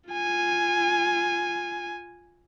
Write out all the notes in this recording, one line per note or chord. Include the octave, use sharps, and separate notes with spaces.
F4 G#5